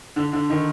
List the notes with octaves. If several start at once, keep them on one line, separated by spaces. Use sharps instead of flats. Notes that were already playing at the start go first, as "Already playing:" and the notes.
D3
D3
D#3